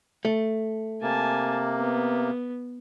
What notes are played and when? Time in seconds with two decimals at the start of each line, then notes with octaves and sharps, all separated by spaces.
0.25 A3
1.02 C3 A#3 G#5 A5
1.78 B3